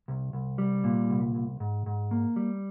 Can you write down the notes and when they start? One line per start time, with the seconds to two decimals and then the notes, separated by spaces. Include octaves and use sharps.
0.08 C2
0.33 C2
0.58 G3
0.84 A#2
1.10 C2
1.35 C2
1.60 G#2
1.86 G#2
2.11 A#3
2.36 G3